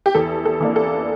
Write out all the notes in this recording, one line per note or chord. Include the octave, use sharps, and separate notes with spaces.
G4
E2 A4
A4
E3 A#3 D4
A4